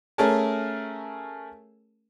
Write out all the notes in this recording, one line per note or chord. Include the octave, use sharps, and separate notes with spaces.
A3 C#4 G#4 A#4 G#5 A5